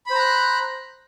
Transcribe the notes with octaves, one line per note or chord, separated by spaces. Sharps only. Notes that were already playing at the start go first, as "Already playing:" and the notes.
C5 A#5 B5 F#6